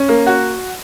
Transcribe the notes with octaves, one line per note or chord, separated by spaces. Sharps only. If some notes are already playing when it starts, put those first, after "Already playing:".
Already playing: C#4
A#3
F#4